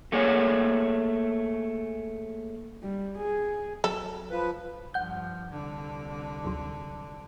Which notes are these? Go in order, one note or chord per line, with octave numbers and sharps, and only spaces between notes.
A3 A#3 G#4 C#5
G3
G#4
F#3 A4
F3 B4
G2 F3 F#5 G6
C2 D3
A1 D2 F#3